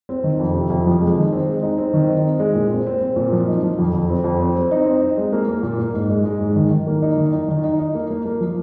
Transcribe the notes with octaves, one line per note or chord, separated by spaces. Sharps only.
C4
D#3
F2
C3
F2
F3
G#3
D#3
C4
G#3
D#4
C4
D#3
D#4
C4
G#3
A#2
C4
C4
C4
A#2
F3
D#4
F3
F2
F2
C4
F2
C4
C4
D#4
C4
D#4
G#3
A#3
A#3
A#2
A#3
G#2
G#3
G#3
G#2
D#3
D#3
A#3
D#4
D#3
D#4
D#3
D#4
D#4
A#3
A#3
A#3
F3